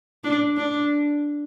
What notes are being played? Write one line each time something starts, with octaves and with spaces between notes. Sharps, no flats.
D4
D4